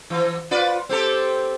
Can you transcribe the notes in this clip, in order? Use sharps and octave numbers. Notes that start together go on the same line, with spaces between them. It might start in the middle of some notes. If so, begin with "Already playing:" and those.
E3
F4 B4 D5
C4 G4 A4